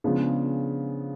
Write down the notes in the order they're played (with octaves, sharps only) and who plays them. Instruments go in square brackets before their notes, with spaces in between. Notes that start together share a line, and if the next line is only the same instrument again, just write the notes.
[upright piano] C#3 F3 G#3 B3 D4